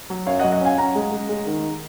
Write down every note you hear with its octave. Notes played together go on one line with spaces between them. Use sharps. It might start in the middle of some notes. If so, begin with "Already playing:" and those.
F#3
F#2 C#5 F5
D#5 F#5
F#3
D#5 F#5
C#4 F5 G#5
C#4 F#5 A#5
G#3
G#3
G#3
D#3